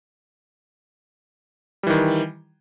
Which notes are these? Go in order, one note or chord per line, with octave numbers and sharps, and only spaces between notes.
D#3 E3 G3